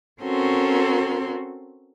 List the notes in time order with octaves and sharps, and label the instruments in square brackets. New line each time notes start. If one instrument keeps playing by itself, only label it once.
[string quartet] C4 C#4 F#4 A4 A#4 C6